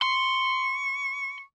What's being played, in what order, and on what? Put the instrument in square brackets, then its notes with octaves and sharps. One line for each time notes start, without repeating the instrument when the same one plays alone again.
[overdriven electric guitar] C6 [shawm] C#6